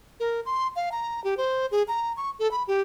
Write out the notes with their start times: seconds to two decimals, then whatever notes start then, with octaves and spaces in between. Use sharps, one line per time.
0.20 A#4
0.46 C6
0.76 F5
0.92 A#5
1.24 G4
1.37 C5
1.71 G#4
1.88 A#5
2.17 C#6
2.39 A4
2.51 B5
2.68 G4